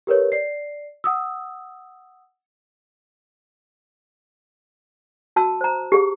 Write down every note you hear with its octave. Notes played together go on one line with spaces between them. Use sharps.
G4 A#4 B4 C#5
D5 C7
F#5 D#6 E6
F#4 A5 E6
C5 A#5
G4 G#4